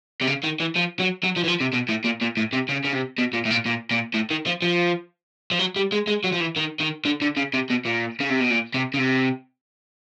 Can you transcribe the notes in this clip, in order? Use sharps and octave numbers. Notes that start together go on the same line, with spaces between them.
C3
C#3
D#3
E3
F3
F#3
F#3
F3
E3
F3
C3
B2
A2
A#2
A#2
A2
C3
C#3
C#3
C3
B2
A#2
A2
A#2
A#2
A#2
A2
D#3
F3
F3
F3
F#3
G3
G#3
G#3
F#3
F3
E3
D#3
D#3
D3
D3
C#3
C3
B2
A#2
C#3
C3
B2
A#2
C3
C#3
C3